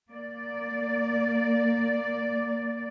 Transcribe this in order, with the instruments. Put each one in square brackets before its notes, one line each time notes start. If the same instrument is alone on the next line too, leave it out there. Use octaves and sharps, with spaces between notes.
[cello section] A#3 D5